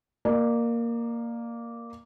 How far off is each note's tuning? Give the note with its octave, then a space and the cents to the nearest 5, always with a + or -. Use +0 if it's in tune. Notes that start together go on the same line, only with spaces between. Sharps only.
A#3 +0 D5 +35